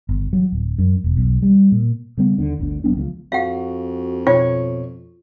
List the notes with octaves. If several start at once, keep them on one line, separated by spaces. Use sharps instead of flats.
G1
F#3
D1
F#2
E1
B1
G3
A#2
C#3 G3 B3
D#2 D3
G1 D2 D3
F1 F#3 B3 D4
C#2 D#3 F3
F2 F#4 F5 F#5
B2 F4 C#5